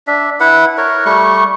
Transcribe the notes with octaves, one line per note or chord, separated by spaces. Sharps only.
D4 E5
E4 B4 F#5
A#4 C#5
G3 A3 C#6